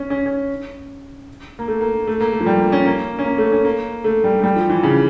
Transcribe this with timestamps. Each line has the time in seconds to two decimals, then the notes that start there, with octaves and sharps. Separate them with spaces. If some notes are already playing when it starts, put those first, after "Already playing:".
Already playing: C#4
0.10 C#4
0.26 C#4
1.59 A#3
1.68 A3
1.81 A#3
2.07 A3
2.21 A#3
2.33 A3
2.40 F3
2.46 G3
2.60 A#3
2.72 C#4
2.86 A#3
3.19 C#4
3.25 A#3
3.38 A3
3.52 C#4
3.65 A#3
4.04 A3
4.24 G3
4.39 A3
4.44 G3
4.56 F3
4.70 E3
4.83 C#3